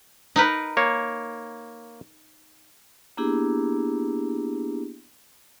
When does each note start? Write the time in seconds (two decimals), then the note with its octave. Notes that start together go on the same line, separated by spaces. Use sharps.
0.36 D#4 A#4 B4
0.77 A#3 C#5
3.17 A#3 B3 D4 E4 G4 G#4